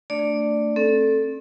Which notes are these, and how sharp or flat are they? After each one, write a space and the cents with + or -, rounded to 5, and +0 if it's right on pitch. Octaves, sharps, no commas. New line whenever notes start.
A3 +25 D4 +0 D5 +0
C4 +40 A4 +0